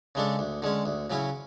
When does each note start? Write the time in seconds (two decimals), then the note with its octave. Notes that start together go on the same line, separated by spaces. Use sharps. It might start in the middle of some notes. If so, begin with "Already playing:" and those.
0.15 C#3 G#3 D4 A4
0.39 D2
0.62 D3 G#3 C#4
0.85 D2
1.10 C#3 F#3 C#4 E4